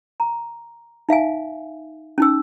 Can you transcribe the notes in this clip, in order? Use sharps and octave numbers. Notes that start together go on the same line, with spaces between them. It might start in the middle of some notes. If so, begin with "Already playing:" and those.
A#5
D#4 E5 F5 G#5
C#4 D#4 E6